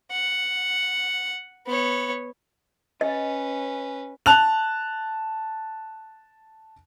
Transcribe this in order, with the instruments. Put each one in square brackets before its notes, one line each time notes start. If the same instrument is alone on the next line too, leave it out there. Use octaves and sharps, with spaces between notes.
[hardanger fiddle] F#5
B3 C#5
[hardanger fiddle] C#4 B4 [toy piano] D#5
[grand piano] A5 F#6 F7